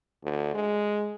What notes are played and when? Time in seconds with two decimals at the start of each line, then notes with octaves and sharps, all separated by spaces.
0.24 D2
0.55 G#3